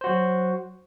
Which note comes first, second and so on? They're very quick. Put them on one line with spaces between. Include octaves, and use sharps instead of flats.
C5 F#4 F#3